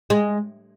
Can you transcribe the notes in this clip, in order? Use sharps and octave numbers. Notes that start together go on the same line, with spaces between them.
G#3